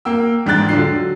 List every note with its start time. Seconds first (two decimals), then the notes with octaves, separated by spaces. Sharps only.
0.05 A#3 G5 E6
0.46 E2 G#2 D4 G5 F#6 A6
0.69 D3 F#3 D4 F4 C7
0.84 F#3